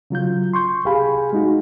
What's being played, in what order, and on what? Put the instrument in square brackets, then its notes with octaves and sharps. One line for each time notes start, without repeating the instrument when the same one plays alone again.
[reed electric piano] C#3 F#3 F4 G6
C6 C#6 G6
C2 G4 G#4 F5 G#5 B5
G#3 D#4 F#4